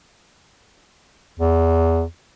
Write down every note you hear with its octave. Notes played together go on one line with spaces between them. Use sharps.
E2